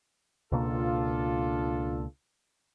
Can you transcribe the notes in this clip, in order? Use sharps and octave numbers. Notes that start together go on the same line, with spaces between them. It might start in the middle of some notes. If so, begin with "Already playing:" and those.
C#2 B2 A#3 D4 F4 A4